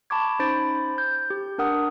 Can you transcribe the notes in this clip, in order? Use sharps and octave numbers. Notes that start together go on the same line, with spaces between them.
A5 B5 C#6 D6 G#6
C#4 D#4 C5 B5 A6 D7
G6
G4
D4 A#4 F#5 D#6